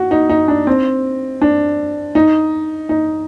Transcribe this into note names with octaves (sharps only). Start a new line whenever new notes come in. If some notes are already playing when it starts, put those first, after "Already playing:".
Already playing: F#4
D#4
D#4
D4
C4
D4
D#4
D#4